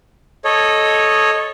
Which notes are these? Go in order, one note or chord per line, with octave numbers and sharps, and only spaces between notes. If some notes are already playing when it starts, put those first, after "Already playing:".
A4 C#5 D#5